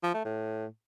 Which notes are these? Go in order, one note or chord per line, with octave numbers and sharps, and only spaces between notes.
F3
A3
A2